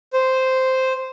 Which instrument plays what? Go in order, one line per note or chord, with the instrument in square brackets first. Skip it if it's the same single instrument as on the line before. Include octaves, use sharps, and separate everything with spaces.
[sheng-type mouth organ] C5